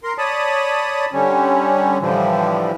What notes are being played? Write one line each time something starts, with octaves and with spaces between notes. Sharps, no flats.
A#4 C6
C#5 D5 A5 B5 D#6
D3 G3 C#4
A2 D3 E3 F3 G3